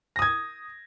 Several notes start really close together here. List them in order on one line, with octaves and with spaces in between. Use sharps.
A#6 D#6 G#6